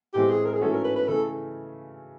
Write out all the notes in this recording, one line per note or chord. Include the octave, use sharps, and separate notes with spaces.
A2 E3 G#3 C4 G4
G#4
A#4
G#4
G#2 E3 A3 C#4 F#4 A4
A#4
B4
B4
C#3 E3 A3 A4